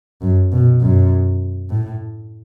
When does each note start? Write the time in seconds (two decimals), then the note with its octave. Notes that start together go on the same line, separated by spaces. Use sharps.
0.22 F#2
0.52 B2
0.81 F#2
1.70 A2